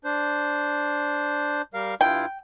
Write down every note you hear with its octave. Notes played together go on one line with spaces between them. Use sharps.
D4 C5
G3 A#4 F5
G2 E4 F4 G5